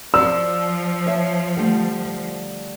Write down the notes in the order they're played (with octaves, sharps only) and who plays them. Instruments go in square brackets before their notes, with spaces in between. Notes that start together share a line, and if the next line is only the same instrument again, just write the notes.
[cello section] F3 [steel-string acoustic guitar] D5 [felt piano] E6
[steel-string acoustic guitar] C#5 E5
D3 G3 A3